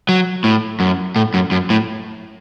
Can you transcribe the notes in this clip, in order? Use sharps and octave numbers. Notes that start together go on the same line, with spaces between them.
F#3
A2
F#2
A2
F#2
F#2
A2